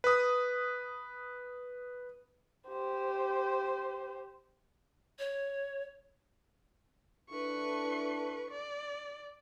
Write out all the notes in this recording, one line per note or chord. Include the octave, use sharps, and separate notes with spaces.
B4 D#6
G4 C5
C#5
D4 E4 A4 B4 C#6
D5